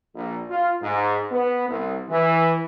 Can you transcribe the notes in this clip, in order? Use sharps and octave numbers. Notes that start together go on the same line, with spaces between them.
A#1
F4
G#2
B3
C2
E3